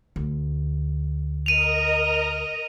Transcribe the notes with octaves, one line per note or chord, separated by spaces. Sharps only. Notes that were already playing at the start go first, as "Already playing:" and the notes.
D2
A#4 D#5 A#5 D#7 F7